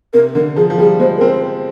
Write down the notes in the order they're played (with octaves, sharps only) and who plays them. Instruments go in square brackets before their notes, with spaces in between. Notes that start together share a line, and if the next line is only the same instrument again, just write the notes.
[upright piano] C3 [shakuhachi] A#4
[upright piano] D3 [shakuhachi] A#4
[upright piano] F3 [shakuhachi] G#4
[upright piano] F3
[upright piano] G3 [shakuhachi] G#4
[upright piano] G#3 [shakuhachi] C5
[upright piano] C4 [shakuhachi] A#4
[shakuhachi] C5